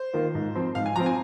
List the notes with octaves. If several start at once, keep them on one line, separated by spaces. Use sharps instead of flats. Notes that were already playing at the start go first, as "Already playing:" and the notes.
Already playing: C5
D#3 A#3 F4
G#2
F3 C4
G#2 F5
G#5
F3 C4 A#5
G#5